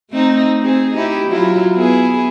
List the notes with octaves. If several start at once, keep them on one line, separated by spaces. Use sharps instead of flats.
A3 C4 D#4
C4 G#4
D#4 E4 G4
F#3 E4 F4
B3 E4 G#4